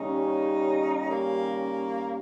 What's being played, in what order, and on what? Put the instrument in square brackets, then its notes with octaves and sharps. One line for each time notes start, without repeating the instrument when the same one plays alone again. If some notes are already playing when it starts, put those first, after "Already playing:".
Already playing: [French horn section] D#2 C#3 G3 C#4 G4 [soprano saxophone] D#4
[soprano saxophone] A#3